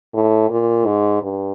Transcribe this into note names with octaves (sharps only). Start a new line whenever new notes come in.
A2
A#2
G#2
G2